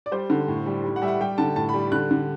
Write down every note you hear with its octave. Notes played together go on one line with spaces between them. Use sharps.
D5
G3 C5
D3
A2
G3
G3
F#5
G3 E5
F#5
G3 G5
D3 A5
A2 A5
B5
G3
D3 F#6
D3